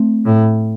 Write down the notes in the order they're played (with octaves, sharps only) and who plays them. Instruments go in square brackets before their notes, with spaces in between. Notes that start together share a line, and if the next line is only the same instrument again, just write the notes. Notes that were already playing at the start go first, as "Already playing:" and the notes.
Already playing: [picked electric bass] A3 C4
[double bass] A2